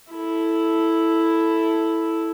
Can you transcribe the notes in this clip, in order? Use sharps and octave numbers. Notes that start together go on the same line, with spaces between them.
E4 A4